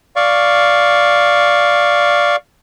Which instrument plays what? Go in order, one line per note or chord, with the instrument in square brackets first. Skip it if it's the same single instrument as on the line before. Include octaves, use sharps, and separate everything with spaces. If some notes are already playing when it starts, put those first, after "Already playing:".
[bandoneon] D5 F5 C#6